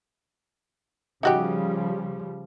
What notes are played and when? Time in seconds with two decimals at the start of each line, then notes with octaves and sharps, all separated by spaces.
1.23 C#3 F3 G3 D#4 F#4 G4